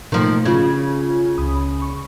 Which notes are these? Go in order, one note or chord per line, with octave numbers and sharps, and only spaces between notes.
B2 D#3 F3 A3 A#3
C#3 F4 G#6
C#2 B5 D#6
C#6